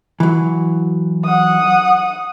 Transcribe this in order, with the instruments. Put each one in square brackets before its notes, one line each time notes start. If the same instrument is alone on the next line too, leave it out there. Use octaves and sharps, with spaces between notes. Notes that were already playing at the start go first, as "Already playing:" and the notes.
[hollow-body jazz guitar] E3 F#3
[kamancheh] F#5 D#6